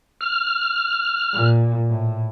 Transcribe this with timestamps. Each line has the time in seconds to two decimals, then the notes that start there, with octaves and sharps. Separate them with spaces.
0.21 F6
1.34 A#2
1.89 A2